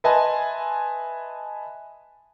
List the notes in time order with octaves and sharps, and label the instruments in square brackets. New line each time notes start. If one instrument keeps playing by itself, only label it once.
[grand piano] B4 D#5 E5 G#5 A5 C6